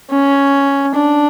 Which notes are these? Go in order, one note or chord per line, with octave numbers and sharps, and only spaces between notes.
C#4
D4